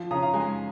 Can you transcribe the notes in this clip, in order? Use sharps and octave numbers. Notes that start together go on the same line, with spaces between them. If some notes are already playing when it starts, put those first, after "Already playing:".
Already playing: F3
C#3 A#5 D#6
F5 A#5
G#3 G#5